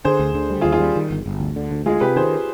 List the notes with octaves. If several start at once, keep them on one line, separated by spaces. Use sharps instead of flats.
D3 G#4 C5
D2
D3
G3
F4 G#4
D#2
F4 G#4
G3
D#3
G1
G1
D2
D3
D2
G#3 F4 G#4
C3 G4 B4
D#3 G#4 C5